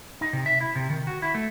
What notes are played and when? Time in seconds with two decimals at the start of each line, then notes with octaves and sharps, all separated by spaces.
0.21 D#4
0.33 C3
0.46 E5
0.61 E4
0.75 C3
0.90 D#3
1.07 F#4
1.22 E4
1.35 A3